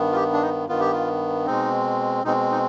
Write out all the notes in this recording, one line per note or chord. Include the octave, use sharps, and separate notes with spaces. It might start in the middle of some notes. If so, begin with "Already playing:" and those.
Already playing: G2 D#3 B3
F4
G4
D4
D#4
G2 D#3 B3 F4
G4
F4
B2 G#3 C4 D#4
B2 G#3 C4 D#4
D#4